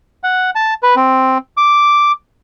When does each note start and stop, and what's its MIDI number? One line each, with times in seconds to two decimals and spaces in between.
0.24 0.50 78
0.55 0.74 81
0.83 0.95 71
0.96 1.38 60
1.57 2.12 86